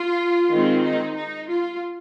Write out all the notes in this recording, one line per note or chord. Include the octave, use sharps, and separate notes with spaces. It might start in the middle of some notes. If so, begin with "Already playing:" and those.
Already playing: F4
D#3 G#3 C4
D#4
D#4
F4